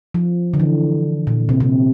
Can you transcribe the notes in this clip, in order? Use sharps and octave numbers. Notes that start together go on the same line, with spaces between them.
F3
D3
E3
A#2
C3
C3